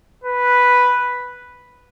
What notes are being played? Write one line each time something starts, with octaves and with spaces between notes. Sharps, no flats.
B4